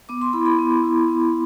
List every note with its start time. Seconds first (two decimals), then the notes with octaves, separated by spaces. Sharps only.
0.09 B3 D6
0.21 C6
0.33 E4 B5
0.46 B5
0.59 B3
0.83 E4
1.09 B3